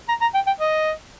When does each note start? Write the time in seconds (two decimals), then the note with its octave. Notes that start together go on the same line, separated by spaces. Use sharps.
0.09 A#5
0.21 A#5
0.35 G5
0.47 G5
0.60 D#5